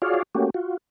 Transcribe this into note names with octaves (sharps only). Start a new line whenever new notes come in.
F4 F#4 G#4 C#5 D5 F5
A3 A#3 C#4 F#4 G4
F4 F#4